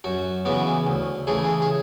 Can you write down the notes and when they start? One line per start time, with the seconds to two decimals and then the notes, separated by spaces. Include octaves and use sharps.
0.04 F#2 F#4
0.45 C#3 E3 B3 F#4
0.87 D2
1.27 C#3 E3 A3 G#4
1.62 G#4